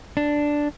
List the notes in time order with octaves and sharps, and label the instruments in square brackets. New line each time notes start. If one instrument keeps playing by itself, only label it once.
[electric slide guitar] D4